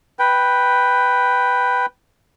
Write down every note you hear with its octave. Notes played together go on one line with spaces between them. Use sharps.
B4 G5